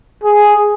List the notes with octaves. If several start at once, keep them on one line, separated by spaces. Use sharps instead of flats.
G#4